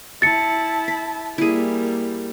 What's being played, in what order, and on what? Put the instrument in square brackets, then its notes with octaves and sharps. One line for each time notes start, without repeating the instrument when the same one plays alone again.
[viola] E4 A5 [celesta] A6 C#7
[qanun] B5
[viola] G3 A#3 [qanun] E4 G#4